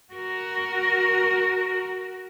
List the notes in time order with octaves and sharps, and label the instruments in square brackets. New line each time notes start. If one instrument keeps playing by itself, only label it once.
[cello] F#4 A#4